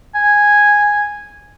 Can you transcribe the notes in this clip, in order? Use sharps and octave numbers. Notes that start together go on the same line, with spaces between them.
G#5